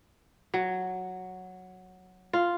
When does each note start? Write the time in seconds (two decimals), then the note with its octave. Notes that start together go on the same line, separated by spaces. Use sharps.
0.54 F#3
2.33 F4